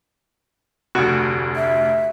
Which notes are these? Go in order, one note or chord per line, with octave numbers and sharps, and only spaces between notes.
F1 D2 F#4
E5